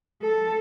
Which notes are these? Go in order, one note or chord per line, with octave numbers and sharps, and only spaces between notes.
A4